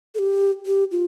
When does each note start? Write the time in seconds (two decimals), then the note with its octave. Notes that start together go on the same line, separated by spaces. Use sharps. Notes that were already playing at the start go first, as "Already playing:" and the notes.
0.15 A4
0.19 G4
0.66 G4
0.91 F4